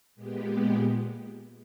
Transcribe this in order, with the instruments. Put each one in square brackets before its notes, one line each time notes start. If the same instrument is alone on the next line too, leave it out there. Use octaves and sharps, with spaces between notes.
[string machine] A#2 G#3 B3 G4